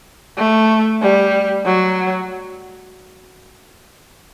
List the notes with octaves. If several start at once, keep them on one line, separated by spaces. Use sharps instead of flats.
A3
G3
F#3